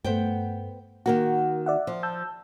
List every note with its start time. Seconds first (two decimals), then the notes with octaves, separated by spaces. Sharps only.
0.05 G2 A3 B3 C5 G5
1.06 D#3 A#3 F#4 A#4 F#5
1.66 D5 E5 F#5
1.87 F3
2.03 A5 E6 G6